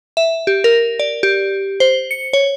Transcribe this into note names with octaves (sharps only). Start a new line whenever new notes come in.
E5
G4
A#4
D5
G4
C5
C#7
C#5